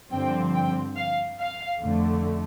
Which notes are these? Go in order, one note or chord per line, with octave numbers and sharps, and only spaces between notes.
G2 D3 F3 C4 G5
G5
F5
F5
F2 D3 A3